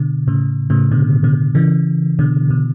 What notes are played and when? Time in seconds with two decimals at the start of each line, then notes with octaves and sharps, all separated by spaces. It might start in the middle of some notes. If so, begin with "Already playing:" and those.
Already playing: B2 D3
0.28 A2 C#3
0.70 A2 C#3
0.91 B2 D3
1.24 B2 D3
1.55 C#3 E3
2.19 B2 D3
2.50 B2